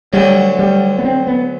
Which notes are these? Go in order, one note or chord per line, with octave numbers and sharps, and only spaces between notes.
D2 D3 F#3 G3
G3
B3
C4
B3